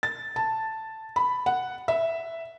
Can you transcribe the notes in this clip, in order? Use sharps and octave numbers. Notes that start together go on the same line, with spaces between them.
A6
A5
B5
F#5
E5